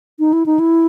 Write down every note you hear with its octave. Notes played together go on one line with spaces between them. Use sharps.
D#4
E4
D#4
E4